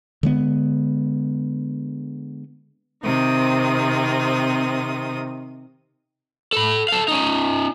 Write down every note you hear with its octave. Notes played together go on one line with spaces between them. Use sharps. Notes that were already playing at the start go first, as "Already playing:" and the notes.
D3 G#3 B3
C3 D#3 C4 D#6
A4 B5
A4 F5
C#4 D#4